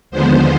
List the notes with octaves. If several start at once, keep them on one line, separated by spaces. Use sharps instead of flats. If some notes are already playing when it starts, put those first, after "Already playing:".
D#2 D3 F3 G#3 B3 C5